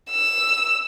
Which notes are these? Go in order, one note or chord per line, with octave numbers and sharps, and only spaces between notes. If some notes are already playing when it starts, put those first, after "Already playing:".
E6